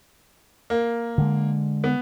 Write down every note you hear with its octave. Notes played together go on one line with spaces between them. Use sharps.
A#3
D3 G#3
B3